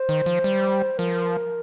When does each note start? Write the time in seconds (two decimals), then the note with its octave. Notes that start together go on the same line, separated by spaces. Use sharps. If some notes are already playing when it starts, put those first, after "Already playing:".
Already playing: C5
0.09 D#3
0.26 F3
0.44 G3
0.98 F3 A#4